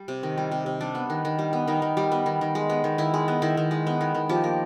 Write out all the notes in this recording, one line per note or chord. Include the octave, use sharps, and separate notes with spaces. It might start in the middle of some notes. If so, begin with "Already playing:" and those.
Already playing: G3
C3
D#3
G3
C3
C3
G3 D4
B3
D#3
D#3
G3
B3
D#3 D#4
D#3
G3
B3
D#3
D#3
G#3
B3
D#3
D#3 E4
G#3
B3
D#3 E4
D#3
G#3
B3
D#3
D#3
F3 G4
A#3